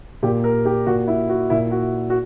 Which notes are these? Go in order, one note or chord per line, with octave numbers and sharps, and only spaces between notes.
A#2 G4
A#4
G4
A#2 F#4
E4
F#4
A#2 E4
F#4
F#4